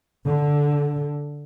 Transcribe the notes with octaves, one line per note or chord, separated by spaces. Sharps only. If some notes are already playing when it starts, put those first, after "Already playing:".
D3